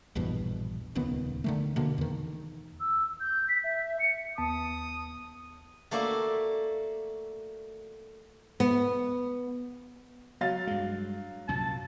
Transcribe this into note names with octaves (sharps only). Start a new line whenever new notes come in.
A#1 E2 G2 B2
D#1 C#2 D#3 B3
D3 D#3 A3
B2 D3 A#3
E2 D#3
E6
G6
B6
E5
C#7
D#2 B3 A5 D#6
A3 A#3 F#4 D5 E5
B3
F#3 F5 A6
G2 G#3
C2 F#2 A#2 A5